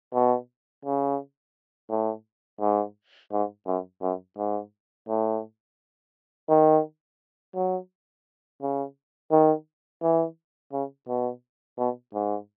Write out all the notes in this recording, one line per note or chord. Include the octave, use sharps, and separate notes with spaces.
B2
C#3
A2
G#2
G#2
F#2
F#2
G#2
A2
D#3
F#3
C#3
D#3
E3
C#3
B2
B2
G#2